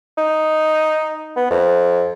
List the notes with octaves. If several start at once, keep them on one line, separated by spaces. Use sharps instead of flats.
D#4
B3
F2